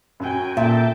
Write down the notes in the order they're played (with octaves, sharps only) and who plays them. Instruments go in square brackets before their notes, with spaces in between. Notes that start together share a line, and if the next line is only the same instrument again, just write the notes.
[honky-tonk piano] F#2 [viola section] F#4 G5 G#5
[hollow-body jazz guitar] A#2 [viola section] A4 G5 A5 [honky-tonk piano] E5